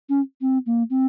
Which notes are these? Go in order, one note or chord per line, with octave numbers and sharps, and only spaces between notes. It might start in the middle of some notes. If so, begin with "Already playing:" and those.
C#4
C4
A#3
C4